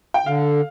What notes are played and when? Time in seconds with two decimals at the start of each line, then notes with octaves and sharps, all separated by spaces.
0.14 G5
0.26 D3 F5